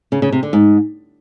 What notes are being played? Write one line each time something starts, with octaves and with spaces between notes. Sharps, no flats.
C#3
C#3
C3
D3
G#2